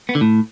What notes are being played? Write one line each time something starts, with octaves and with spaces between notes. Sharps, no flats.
B3
D3
A2